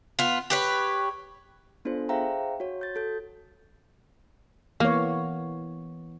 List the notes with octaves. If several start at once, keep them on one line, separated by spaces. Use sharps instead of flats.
B3 F4
G4 B4 C#5
B3 D4 F4 A4 C5
G#4 C5 E5 F5 G5 A#5
F#4 C#5
G6 A6
F#4 A4 G6
E3 A#3 B3 C#5